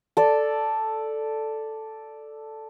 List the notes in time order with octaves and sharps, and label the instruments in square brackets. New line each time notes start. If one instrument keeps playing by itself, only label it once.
[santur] A4 D5